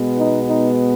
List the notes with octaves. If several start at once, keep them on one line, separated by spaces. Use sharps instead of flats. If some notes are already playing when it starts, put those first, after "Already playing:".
Already playing: B2 G#3 B3
D#4
D#4